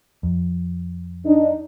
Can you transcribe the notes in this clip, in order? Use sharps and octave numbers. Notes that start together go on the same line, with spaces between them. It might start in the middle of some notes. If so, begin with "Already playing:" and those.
F2
D4 D#4